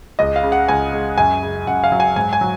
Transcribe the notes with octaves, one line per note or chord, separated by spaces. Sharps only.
C#2 D#5
F5
C#3
F#5
C#2 G#5
G#3
F#2 G#5
C#3
F#2 F#5
F5
F#3
G#5
G#2 G#5
G#5
F#3